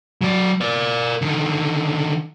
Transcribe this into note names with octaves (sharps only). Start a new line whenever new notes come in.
F#3 D5
A#4 D5
D3 D#3